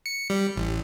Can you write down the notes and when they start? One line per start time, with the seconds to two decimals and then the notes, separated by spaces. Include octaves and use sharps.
0.06 C#7
0.30 G3
0.56 A1